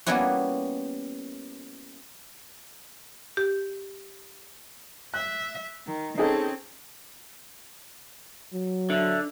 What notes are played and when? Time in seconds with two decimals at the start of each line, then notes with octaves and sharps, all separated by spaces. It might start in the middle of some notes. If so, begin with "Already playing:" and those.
0.06 G3 A#3 B3 C#4 E4 F#4
3.37 G4
5.14 E5 F#6
5.86 D#3
6.18 C4 C#4 D#4 G#4 A4
8.53 F#3
8.90 D3 E5